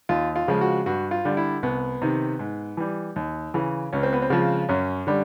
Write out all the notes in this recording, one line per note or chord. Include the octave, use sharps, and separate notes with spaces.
D#2 F4
F4
C#3 F3 G#3
F#4
G2 F#4
F4
D3 G3
E4
C2 B3
C3 D#3
G#2
E3 G3
D#2
C#3 E3
C#2 C#4
C4
B3
C4
C#3 F3 G#3
F#2 C#4
D3 G3